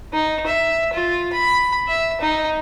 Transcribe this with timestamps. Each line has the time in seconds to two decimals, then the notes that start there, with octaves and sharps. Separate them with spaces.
0.13 D#4
0.46 E5
0.93 F4
1.33 B5
1.88 E5
2.21 D#4